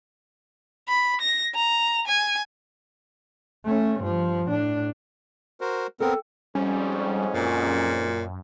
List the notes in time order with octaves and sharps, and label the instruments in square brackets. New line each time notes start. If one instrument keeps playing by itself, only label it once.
[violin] B5
A#6
A#5
G#5
[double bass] A3 C#4
G2 F3
A2 D4
[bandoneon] F#4 A#4 C5
[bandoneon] B3 C4 A#4 [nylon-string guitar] A4 G5
[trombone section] F2 G#2 [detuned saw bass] G3 [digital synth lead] C#4
[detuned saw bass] F#2 [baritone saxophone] A#2